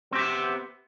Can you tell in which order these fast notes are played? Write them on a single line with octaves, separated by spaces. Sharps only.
C4 G4 E5 B3